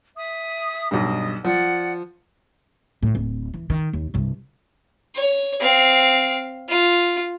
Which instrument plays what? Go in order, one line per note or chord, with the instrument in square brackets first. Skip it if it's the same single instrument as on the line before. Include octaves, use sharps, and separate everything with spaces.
[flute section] E5 D#6
[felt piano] B1 G2 [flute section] D#5 D#6
[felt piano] F3 [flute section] D5 F#5
[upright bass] A2
D1
E3
D#3
D#2
C2 G2
[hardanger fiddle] C#5
C4 F5
F4